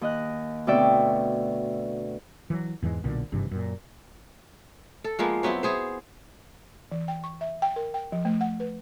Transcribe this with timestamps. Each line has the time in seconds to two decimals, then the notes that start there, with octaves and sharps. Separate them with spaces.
0.01 D#2 D#5 F#6
0.67 D2 B2 C4 D5 E5 G5
2.50 E3 F#3
2.82 E2 G#2 E3 G#3
3.04 B1 A#2 D3
3.32 G#1 G2 C3 E3
3.51 F#2 A#2
5.04 A4
5.19 F3 G#3 A#3 B3
5.43 F#3 B3 C4 E4
5.63 B3 G#4 C5
6.92 E3
7.08 G5
7.24 C#6
7.41 E5
7.62 G5
7.76 A#4
7.94 G5
8.12 F3
8.25 A3
8.41 F#5
8.60 B4